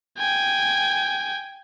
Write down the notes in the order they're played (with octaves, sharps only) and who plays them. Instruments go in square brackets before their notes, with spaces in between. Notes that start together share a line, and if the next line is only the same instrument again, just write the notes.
[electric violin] G5 G#5